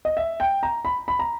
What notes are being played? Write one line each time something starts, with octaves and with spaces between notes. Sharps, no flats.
D#5
E5
G5
A#5
B5
B5
A#5